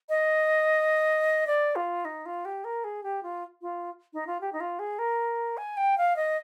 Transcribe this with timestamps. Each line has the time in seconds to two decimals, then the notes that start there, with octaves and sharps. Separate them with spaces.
0.09 D#5
1.47 D5
1.76 F4
2.05 D#4
2.26 F4
2.45 G4
2.64 A#4
2.84 G#4
3.03 G4
3.23 F4
3.62 F4
4.13 D#4
4.27 F4
4.41 G4
4.53 D#4
4.60 F4
4.79 G#4
4.99 A#4
5.57 G#5
5.77 G5
5.98 F5
6.16 D#5